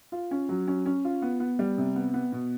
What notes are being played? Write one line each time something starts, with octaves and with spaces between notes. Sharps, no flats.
F4
C#4
F#3
C#4
C#4
F4
B3
B3
G3
C3
B3
B3
B2